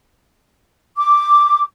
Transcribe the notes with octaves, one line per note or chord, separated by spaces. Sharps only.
D6